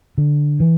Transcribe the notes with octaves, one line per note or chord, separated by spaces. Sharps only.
D3
E3